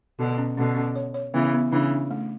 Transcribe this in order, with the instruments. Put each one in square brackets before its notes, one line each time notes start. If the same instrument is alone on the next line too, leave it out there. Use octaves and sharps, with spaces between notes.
[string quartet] B2 D3 [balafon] F#4
[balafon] C#4
[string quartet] B2 D3 [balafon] C#4
[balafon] C#4
C#5
C#5
[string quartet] C#3 E3 [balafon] B3
[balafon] B3
[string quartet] C#3 E3 [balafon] D4
[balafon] D4
A3